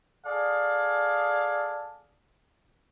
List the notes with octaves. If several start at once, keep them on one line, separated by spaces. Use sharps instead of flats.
G#4 A4 D5 F5